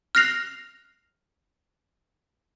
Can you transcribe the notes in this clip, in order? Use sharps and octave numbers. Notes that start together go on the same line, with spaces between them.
F6 F#6 A#6 C7 F7